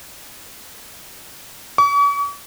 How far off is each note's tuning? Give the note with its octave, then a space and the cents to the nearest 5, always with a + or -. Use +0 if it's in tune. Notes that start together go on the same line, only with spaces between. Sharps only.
C#6 +45